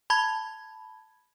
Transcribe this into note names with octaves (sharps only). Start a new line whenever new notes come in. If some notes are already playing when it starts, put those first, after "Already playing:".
A5 B5 G#6